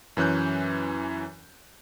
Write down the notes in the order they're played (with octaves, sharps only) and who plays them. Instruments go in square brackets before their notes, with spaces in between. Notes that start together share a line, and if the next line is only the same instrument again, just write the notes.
[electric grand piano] F#2 E3 C#4 F#6 G6